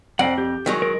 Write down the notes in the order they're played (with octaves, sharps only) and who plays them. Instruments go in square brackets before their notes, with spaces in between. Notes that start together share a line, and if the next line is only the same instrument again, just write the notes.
[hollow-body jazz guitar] F2 [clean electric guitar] C5 D5 F#5
[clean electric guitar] G4
[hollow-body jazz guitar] D#3 F#3 G#3
[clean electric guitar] A#4